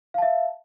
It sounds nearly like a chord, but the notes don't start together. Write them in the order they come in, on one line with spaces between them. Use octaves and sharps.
F5 A5 E5